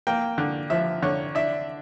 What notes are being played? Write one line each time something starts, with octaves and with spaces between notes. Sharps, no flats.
A#3 G5
D3
F3 E5
D3 C#5
D4 E5